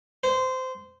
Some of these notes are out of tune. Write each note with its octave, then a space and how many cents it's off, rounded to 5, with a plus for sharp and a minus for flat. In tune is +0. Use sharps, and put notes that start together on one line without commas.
C5 -20